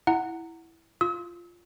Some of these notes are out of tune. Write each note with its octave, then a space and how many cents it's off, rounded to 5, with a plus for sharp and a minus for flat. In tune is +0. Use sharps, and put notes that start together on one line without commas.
E4 +0 F#5 +0 A#5 -25
F4 -5 E6 -45